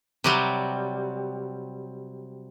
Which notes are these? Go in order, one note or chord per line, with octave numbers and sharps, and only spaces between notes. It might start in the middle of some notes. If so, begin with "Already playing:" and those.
C3 F#3 G3